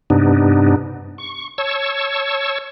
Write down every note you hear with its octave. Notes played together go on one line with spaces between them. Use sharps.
G2 C3 B3 D4 D#4
C#6
C#5 A5 C#6 E6